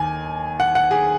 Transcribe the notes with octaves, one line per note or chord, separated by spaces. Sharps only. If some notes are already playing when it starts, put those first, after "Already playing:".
Already playing: D#2 D#3 G#5
F#5
F#5
G#4